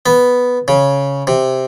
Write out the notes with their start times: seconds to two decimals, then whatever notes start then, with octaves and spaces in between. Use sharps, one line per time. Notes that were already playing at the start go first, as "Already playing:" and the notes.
0.06 B3
0.68 C#3
1.27 C3